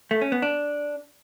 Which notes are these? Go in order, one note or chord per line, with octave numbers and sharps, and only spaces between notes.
A3
C#4
B3
D4